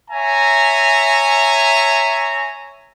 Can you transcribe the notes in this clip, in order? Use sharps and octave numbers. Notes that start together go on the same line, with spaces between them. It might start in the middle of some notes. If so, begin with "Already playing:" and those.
C#5 E5 G#5 A#5